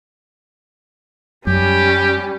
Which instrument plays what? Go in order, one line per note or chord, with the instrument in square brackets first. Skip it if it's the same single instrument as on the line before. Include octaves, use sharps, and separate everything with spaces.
[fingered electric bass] F#2 [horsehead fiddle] G3 C#4 [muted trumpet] G4